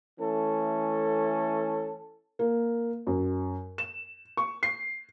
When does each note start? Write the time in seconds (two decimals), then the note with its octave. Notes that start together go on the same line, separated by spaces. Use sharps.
0.19 E3 A3 C#4 A4
2.39 A#3
3.07 F#2
3.78 E7
4.37 C#6
4.63 C7